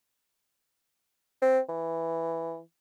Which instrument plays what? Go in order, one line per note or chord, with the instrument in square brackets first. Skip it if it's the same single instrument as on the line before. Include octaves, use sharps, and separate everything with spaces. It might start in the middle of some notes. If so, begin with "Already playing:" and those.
[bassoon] C4
E3